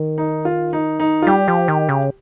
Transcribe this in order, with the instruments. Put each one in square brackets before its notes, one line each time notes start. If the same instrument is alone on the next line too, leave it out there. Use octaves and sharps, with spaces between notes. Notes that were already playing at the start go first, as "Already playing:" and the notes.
Already playing: [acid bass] D#3
[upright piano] D#4
F4
D#4
D#4
F4
[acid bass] G3 [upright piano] G4
[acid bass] F3
D#3
C#3